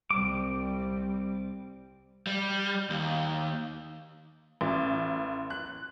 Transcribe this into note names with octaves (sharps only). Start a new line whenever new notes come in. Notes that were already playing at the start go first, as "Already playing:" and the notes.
C2 G3 C4 D6
G3
D#2
A1
F#6